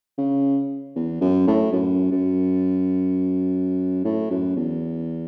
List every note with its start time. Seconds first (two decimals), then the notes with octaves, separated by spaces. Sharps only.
0.18 C#3
0.96 E2
1.21 F#2
1.47 A2
1.73 F#2
2.11 F#2
4.04 A2
4.30 F#2
4.56 E2